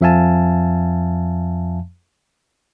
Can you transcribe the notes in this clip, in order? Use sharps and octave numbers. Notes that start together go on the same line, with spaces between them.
F2 F3 E5 F5 G#5 A5